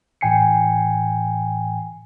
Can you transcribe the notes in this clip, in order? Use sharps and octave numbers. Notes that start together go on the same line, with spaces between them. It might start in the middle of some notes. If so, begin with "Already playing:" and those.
A2 E3 G5 G#5 C7 C#7